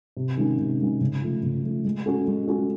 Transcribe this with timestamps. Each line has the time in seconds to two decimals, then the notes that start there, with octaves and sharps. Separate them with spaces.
0.17 C3
0.37 D#3 G#3 C#4
0.58 C3
0.80 D#3 G#3 C#4
1.01 C#3
1.22 F3 A3
1.43 C#3
1.63 F3 A3
1.85 G#3
2.06 C#4 F#4 A4
2.27 G#3
2.47 C#4 F#4 A4